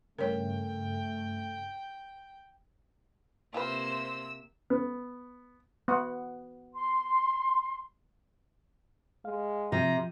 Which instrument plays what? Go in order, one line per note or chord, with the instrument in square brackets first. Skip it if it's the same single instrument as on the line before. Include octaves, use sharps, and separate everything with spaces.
[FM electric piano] G2 C#3 [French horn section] A3 [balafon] A#4 C#5 [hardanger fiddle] G5
[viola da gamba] C3 A#3 [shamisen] E4 F4 B4 [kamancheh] C5 [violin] E6 E7
[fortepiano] B3
[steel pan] B3 F#5
[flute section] C6
[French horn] G#3 [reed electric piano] F5
[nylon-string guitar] C3 [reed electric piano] F3 [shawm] A#5